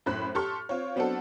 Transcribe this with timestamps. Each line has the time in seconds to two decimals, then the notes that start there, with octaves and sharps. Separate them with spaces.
0.06 F#2 A2 C5 B5 F#6
0.35 G4 A4 C6 C#6 F6
0.69 C4 F4 C#5
0.96 F#3 B3 C4 D4 F#4 A4